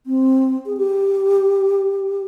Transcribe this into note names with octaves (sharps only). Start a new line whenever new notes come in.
C4
G#4
G4